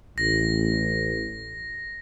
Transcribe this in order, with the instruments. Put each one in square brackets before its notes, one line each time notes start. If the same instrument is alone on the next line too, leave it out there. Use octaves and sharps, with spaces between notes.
[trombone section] A1 [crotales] A#6